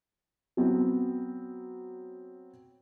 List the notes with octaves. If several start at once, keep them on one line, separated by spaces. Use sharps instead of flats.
F#3 B3 C4